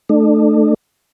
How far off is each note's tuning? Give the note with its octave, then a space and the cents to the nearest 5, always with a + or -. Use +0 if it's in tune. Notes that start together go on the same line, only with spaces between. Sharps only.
A3 +0 D4 +40